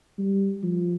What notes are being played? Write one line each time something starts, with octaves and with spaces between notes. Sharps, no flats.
G3
F3